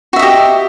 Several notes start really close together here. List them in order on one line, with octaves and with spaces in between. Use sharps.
F#4 E5 D#5 G4